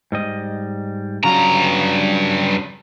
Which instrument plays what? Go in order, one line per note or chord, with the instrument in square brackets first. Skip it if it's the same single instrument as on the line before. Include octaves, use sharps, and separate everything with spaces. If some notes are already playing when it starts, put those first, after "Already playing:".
[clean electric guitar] G#2 G3 D#5
[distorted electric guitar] G2 A#5 [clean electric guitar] C#3 F#3 F4